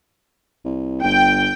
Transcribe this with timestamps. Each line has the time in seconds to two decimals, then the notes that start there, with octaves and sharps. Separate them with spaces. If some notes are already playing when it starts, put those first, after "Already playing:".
0.65 C2
1.04 G1 G5